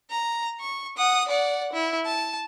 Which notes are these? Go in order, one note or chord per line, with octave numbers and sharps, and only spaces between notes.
A#5
C#6
F#5 D#6
D5 F#5
E4
A5